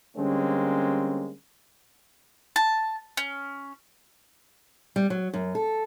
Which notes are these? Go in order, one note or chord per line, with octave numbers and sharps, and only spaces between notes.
D3 G3 G#3 A#3 C4 C#4
A5
C#4
G3
F#3
F#2
A4